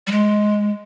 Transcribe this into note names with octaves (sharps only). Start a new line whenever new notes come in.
G3
G#3